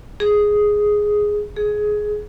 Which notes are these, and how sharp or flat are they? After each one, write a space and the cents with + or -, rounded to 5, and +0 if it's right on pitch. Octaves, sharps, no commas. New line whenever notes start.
G#4 +0
G#4 +15